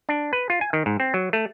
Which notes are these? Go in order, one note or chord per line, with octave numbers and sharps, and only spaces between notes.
D4
B4
F4
G#5
D#3
G#2
C4
F#3
A3